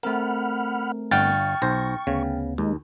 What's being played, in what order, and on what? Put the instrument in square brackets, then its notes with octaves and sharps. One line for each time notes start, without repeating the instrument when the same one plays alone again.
[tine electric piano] A3 C4 A#4 [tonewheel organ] F#5 B5 F6
[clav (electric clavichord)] G1 F#5 [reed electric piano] G5 F6 A6 [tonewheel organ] C#6
[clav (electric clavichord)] B1 C5 [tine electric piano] A#6
[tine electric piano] D2 B3 [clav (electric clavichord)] C#3
[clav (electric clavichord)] D#2 [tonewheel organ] G#3 D#4